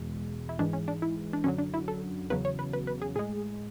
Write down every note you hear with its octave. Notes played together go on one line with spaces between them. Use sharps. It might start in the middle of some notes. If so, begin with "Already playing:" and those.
Already playing: E2 B2 G#3
E4
G#2 E3 G#3 D4
C#4
D4
E4
D4
F#2 D3 F#3 C#4
D4
E4
A4
E2 C#3 F#3 B4
C#5
B4
B4
B4
G#4
A2 G#3 G#4